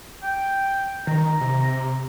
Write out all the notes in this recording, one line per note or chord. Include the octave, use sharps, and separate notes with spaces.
G5
D#3 A#5
C3